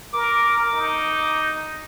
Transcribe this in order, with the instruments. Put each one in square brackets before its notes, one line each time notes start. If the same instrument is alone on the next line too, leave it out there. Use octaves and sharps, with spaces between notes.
[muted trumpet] A#4 [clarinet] D6
[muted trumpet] D#4